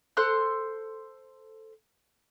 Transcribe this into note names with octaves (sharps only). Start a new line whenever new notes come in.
A4 C5 C6 F#6